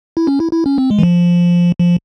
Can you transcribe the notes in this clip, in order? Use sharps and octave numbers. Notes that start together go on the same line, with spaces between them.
E4
C#4
E4
E4
C#4
C4
G#3
E3
F3
F3